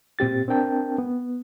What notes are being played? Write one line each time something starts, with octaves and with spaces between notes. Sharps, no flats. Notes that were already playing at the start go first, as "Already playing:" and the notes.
A#2 C4 G4 A6
C4 D4 A#4 G5 A5
B3